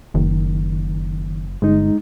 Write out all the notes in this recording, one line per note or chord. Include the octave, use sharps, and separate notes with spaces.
F#1 D#3
G1 G#3 D#4